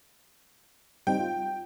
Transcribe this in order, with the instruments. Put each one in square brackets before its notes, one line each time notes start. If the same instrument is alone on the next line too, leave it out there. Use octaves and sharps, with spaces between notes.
[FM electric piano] G3 C4 D#4 [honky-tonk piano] G5
[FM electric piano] F4